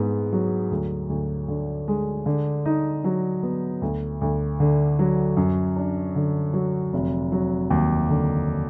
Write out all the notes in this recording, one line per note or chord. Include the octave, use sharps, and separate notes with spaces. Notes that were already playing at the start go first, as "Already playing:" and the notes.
Already playing: G#2 B3
F#3
D2
D2
D3
G#3
D3
D#4
F#3
B3
D2
D2
D3
F#3
F#2
D4
D3
F#3
F1
F#3
D#2
D3